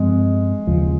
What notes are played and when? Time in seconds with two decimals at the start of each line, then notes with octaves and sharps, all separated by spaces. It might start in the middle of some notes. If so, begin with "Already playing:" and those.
Already playing: G2 F3 G#3 C4
0.67 D#2 C#3 F3